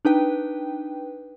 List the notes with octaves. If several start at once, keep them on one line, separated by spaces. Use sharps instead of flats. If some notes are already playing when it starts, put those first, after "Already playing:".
D4 D#4 B4 G5